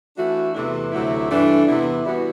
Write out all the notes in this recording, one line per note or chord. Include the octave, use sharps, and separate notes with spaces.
E3 A3 D4 F#4
E2 C3 E3 A3 E4
D2 C3 F#3 A3 E4
G2 E3 A3 D4
E2 C3 E3 B3 E4
E3 G3 B3 F#4